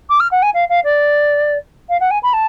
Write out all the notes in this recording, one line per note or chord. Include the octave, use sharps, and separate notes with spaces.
D6
F6
F#5
G#5
F5
F5
D5
F5
F#5
G#5
B5
A5